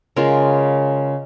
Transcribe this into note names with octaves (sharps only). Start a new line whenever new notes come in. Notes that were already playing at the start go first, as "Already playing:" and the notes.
C#3 G#3 F4 A#4